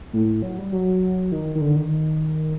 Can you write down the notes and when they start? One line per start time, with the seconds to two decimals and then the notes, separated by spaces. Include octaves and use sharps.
0.13 A2
0.42 F#3
0.58 G3
0.72 F#3
1.32 D#3
1.55 D#3
1.61 D3
1.76 D#3